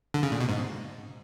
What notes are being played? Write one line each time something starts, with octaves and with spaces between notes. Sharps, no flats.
D3
C#3
A#2
B2
G#2